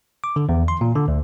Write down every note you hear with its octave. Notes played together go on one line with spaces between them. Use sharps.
D6
D3
E2
C6
A#2
D3
D2